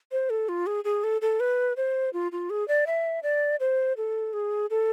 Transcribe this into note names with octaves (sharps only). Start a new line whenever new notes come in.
C5
A4
F4
G#4
G#4
A4
A4
B4
C5
F4
F4
G#4
D5
E5
D5
C5
A4
G#4
A4